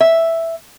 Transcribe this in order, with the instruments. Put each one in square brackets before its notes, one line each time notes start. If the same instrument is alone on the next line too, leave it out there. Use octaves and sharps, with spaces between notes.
[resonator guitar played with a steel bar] E5